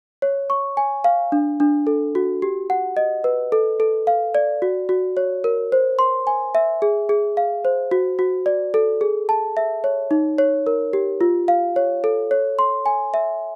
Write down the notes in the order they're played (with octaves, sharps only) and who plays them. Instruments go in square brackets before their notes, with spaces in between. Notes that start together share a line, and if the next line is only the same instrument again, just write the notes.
[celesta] C#5
C#6
G#5
F5
D4
D4
A4
F#4
G4
F#5
D#5
B4
A4
A4
F5
D5
F#4
F#4
C#5
A#4
C5
C6
G#5
E5
G#4
G#4
F5
C5
F#4
F#4
D5
A4
G#4
A5
E5
C#5
D#4
C#5
A#4
G4
F4
F5
C#5
A4
C#5
C6
G#5
E5